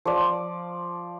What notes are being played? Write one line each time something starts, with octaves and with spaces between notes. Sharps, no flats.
F3 D5